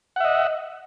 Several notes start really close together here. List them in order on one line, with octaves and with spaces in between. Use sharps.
F#5 E5 D#5